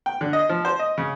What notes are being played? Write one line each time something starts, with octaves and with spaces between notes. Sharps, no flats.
G5
D3
D#5
F3
C5
D#5
C#3